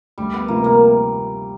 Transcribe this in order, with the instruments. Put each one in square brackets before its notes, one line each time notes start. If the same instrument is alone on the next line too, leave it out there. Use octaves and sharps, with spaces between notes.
[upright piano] D2 [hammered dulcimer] G3
[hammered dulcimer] B3
[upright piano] C3 F3 A3 [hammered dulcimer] A#3
[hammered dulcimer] A#3